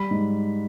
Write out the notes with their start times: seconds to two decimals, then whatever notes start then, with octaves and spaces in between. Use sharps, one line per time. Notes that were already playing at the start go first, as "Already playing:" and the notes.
Already playing: G3 B5
0.11 G#2